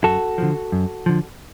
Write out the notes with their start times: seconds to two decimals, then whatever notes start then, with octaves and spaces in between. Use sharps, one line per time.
0.04 F#2 F#4 A4
0.38 D3 F3
0.72 F#2
1.06 D3 F3